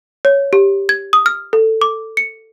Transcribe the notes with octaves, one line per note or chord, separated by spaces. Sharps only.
C#5
G4
G#6
D#6
F6
A4
D6
C#7